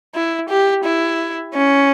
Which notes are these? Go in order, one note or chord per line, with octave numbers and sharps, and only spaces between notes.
E4
G4
E4
C#4